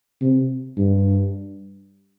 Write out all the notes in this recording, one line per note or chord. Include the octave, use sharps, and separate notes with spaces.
C3
G2